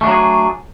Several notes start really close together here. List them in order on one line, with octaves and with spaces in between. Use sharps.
A3 D4 F#3 F#4 G#4